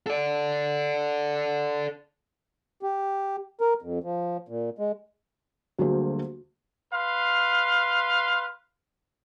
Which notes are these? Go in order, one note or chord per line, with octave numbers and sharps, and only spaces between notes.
A4 D5
G4
A#4
F2
F3
A#2
G#3
D2 F#3 G3 A#3 G#4 C5
B4 F5 C6